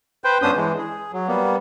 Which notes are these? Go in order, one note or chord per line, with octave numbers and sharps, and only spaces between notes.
B4 C5 G5
G2 B3 C#4 D4 C5 D#6
E3 G#3
G#4
F#3
G3 A#3 B3